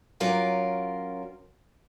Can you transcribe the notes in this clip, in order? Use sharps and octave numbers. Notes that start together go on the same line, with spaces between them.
F#3 C#4 F4 A#4 D5